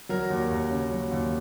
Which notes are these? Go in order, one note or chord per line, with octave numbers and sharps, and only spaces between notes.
F#3 A#4
D#2
D#2
C#3
F#3
D#2